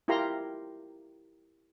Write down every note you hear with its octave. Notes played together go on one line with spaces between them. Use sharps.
E4 F4 G4 A#4 A#5 C6